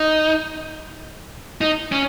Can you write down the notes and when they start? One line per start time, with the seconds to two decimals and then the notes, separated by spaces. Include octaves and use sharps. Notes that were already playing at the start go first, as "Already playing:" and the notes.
Already playing: D#4
1.61 D#4
1.92 C#4